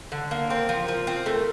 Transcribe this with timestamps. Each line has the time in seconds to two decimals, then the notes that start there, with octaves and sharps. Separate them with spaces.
0.12 D3
0.31 A#3
0.49 C4 A#4
0.69 F3
0.88 F3
1.07 C4
1.26 A3 A#4